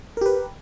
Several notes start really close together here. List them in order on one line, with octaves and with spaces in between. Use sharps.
A#4 G4 B4